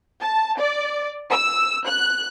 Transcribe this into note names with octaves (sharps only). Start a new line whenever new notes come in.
A5
D5
E6
F#6